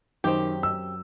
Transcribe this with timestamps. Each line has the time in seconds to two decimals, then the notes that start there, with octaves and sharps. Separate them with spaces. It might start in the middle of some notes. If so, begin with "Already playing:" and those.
0.24 F#2 D#3 C4 G4
0.63 E6